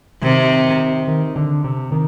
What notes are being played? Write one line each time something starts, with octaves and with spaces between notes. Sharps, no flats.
C3 D#3
D#3
D#3
D3
C3
D#3